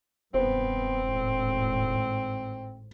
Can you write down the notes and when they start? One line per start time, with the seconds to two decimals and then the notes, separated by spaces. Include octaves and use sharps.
0.34 E1 G2 B3 C4 C5
1.05 G#1 A2